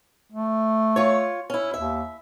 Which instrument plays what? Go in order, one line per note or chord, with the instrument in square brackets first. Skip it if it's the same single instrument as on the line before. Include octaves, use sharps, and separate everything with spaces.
[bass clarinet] A3
[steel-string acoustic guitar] F4 C#5
C#4 E4
[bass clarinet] D#2 [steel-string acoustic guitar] E5